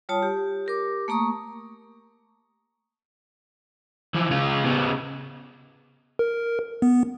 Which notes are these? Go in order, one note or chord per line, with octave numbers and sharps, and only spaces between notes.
G3 F4 C#5 A5 D#6
G4
G4 A#4 D6
A3 A#3 A#5 C#6 D#6
E3 F3
C#3 F4
C#3 B3
A#4
B3